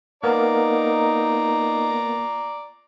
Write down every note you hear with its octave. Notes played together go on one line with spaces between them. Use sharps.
A#3 B3 D#4 A#4 D5 A#5